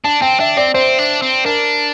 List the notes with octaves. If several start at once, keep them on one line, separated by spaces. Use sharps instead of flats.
D4 A5
C4 G5
D4 E5
C4 D5
C4 C5
D4
C4
D4 A#4